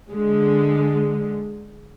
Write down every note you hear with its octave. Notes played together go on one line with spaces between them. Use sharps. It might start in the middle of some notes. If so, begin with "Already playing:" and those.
D3 G#3